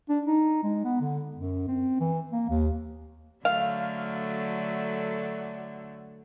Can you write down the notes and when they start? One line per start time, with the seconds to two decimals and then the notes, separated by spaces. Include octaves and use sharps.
0.09 D4
0.25 D#4
0.63 G#3
0.84 B3
1.01 D3
1.36 F#2
1.68 C4
2.00 E3
2.31 A#3
2.49 D#2
3.45 D3 F#3 A3 F5